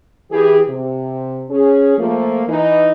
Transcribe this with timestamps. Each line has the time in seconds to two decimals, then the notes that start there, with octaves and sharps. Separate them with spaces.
0.31 E3 G4 G#4
0.68 C3
1.50 C#4 G#4
1.98 F3 A3 A#3
2.48 E3 D#4